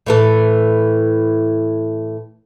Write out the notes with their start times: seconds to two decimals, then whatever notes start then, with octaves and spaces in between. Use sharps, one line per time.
0.06 A2 E3 A4